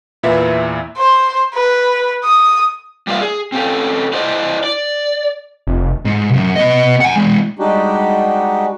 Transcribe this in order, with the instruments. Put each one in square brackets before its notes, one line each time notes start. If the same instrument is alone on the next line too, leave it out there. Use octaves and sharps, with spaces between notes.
[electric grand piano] E2 A#2 E4 B4 E5
[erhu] C5
B4
D#6
[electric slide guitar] G3 A#3 F4 D5 E5
G#4
C4 C#4 G4 A4
D4 E4 C5 D5 D#5
D5
[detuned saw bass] F1
[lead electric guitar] G#2
C2 F#2
B3 D#5
F#5 G#5
E3 G#3
[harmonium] G3 G#3 D4 D#4 F#4 G4